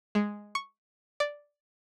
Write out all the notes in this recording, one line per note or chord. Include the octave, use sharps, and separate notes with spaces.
G#3
C#6
D5